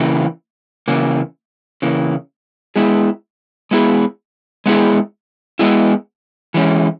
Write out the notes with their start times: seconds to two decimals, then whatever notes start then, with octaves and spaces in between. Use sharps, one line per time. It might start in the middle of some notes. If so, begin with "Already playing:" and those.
Already playing: C#3 E3 A#3
0.88 C#3 E3 A#3
1.82 C#3 E3 A#3
2.76 G#3 B3 E4 G#4
3.71 G#3 B3 E4 G#4
4.66 G#3 B3 E4 G#4
5.59 G#3 B3 E4 G#4
6.54 E3 G#3 C#4